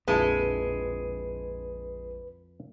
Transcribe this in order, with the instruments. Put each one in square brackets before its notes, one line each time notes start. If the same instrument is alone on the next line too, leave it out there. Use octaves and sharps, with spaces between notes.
[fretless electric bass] A#1 [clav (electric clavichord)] F2 E4 A5 [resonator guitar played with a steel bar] G#3 [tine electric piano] B4